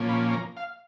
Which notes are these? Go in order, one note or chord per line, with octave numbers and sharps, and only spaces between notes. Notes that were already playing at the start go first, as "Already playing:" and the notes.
Already playing: A#2 F3 A#3 C#4
B5
A#5
F5